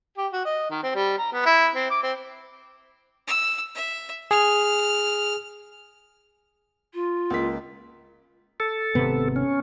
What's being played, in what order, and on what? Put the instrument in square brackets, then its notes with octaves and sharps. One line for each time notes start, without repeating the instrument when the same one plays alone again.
[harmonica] G4
F#4
D#5
D#3
C4
G3
A#5
B3
E4
C4
D6
C4
[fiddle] E6
E5
[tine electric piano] G#4 [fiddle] F6
[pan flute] F4
[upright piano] C#2 A#3 B6
[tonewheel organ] A4
[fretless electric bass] G#1 C3 B3
[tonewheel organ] C#4